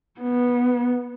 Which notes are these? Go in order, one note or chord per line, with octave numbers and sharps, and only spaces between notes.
B3